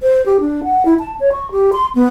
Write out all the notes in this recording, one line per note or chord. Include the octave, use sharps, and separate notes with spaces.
C5
G4
D4
F#5
E4
A5
C#5
C#6
G4
C6
B3